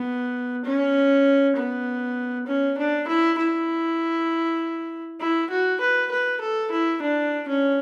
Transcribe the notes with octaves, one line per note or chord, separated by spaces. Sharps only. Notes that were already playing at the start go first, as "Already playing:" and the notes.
Already playing: B3
C#4
B3
C#4
D4
E4
E4
E4
F#4
B4
B4
A4
E4
D4
C#4